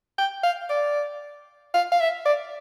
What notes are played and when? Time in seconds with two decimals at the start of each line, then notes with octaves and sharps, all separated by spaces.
0.18 G5
0.43 F5
0.70 D5
1.74 F5
1.92 F5
2.00 E5
2.25 D5